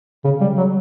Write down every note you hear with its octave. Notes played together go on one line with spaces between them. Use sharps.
C#3
G3
F#3